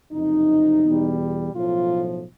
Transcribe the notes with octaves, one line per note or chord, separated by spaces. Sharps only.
F#1 F2 C3 D#4
E2 B2 G3
B1 A2 F3 F4